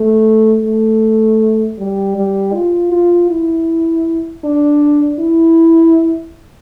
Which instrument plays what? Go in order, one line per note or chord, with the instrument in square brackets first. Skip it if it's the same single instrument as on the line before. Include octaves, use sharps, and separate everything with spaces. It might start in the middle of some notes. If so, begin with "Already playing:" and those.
Already playing: [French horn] A3
A3
G3
G3
F4
F4
E4
D4
E4